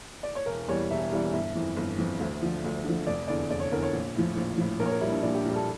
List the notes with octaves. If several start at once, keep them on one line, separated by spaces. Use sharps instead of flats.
D5
C#5
E1 A#4
E2 E3 G3 C#5
E1 E5
E2 E3 G3
G1 E5
F2 E3
G1
F2 E3
D2
D3 F3
D2
D3 F3
F1 D5
E2 D3 D5
F1 D5
C#5
E2 D3 A#4
C#5
A#1
A2 F3
A#1
A2 F3
A#1 A#4
C#5
A#4
A#2 G3 E4
D4
A#1 D4
G4
A#2 G3
A4